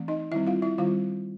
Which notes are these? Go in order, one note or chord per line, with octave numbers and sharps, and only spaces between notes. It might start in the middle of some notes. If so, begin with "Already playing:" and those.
Already playing: E3 A3 C4
D#4 D#5
D#3 G3 C4 E4 E5
F4 F5
E4 E5
D#3 G3 C4 F4 F5